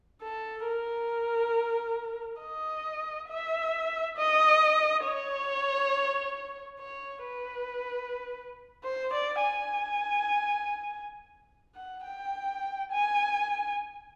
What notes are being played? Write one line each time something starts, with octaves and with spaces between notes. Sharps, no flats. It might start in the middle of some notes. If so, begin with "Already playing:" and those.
A4
A#4
D#5
E5
D#5
C#5
C#5
B4
C5
D5
G#5
F#5
G5
G#5